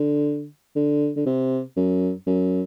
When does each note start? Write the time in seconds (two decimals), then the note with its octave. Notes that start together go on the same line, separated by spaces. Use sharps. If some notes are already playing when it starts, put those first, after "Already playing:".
Already playing: D3
0.76 D3
1.16 D3
1.26 C3
1.77 F#2
2.27 F#2